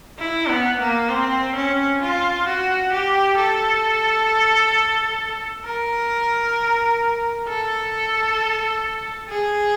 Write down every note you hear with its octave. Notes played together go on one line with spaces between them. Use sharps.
E4
B3
A#3
C4
C#4
F4
F#4
G4
A4
A#4
A4
G#4